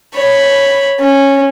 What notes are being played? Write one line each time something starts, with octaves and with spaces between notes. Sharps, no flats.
C#5 B5
C#4